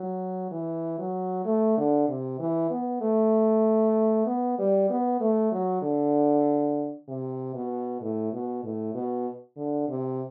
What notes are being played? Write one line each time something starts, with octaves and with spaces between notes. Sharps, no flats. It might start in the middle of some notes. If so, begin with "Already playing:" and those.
Already playing: F#3
E3
F#3
A3
D3
C3
E3
B3
A3
B3
G3
B3
A3
F#3
D3
C3
B2
A2
B2
A2
B2
D3
C3